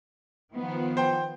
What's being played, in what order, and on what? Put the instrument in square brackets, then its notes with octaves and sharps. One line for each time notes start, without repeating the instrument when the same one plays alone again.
[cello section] D#3 F3 B3
[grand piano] C5 G5